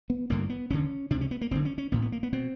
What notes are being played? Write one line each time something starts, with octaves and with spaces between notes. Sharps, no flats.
B3
A1 G2 D3 A#3
B3
F1 D#2 D3 C#4
C#2 C3 D4
C#4
B3
A#3
F#1 F#2 D3 C4
C#4
C#4
A1 A2 B3
B3
A#3
B3
B2 C4